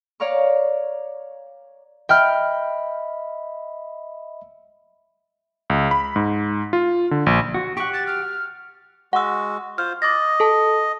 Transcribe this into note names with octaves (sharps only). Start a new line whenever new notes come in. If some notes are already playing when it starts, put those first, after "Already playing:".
C#5 D5 F5 A#5 C#6
D#5 E5 G5 B5 F6
C#2
B5
G#2
F4
D3
A#1
F#4
G4 F#5 C#6
A6
F6
G#3 F#4 F#5 E6
F4 C5 F6
D#5 D6 A6 A#6
A4 A5